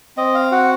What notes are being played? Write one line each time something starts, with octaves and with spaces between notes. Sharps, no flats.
C4 D#5
F5
F#4 F#5